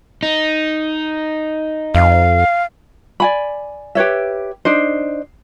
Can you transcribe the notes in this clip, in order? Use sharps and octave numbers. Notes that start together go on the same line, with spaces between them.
D#4
F2 F5
D5 G#5 B5
G4 B4 C#5 E5
D4 D#4 C5